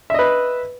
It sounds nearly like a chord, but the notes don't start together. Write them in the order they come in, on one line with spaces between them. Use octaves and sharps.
E5 D#5 B4